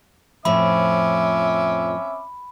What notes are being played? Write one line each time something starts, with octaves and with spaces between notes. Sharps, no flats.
F2 A2 F3 C4 C#4 E5 B5 D6